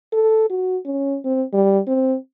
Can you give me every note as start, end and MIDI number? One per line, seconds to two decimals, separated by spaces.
0.13 0.49 69
0.50 0.77 66
0.85 1.17 61
1.24 1.43 60
1.53 1.79 55
1.87 2.16 60